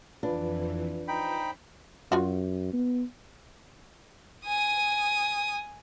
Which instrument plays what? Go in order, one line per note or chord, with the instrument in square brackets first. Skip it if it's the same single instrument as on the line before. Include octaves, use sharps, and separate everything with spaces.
[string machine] F2 E3 [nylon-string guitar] D4 [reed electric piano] F4 B4
[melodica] D#4 G5 B5 [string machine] C5
[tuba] F#2 [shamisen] F4 F#4
[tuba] B3
[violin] G#5 D#6